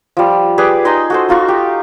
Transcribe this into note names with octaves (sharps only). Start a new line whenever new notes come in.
F3 G3
G4 G#4 B4 D5
D#4 G#4 D#5 C6
F#4 A4 C5
D#4 F4 F#4 C#6
G4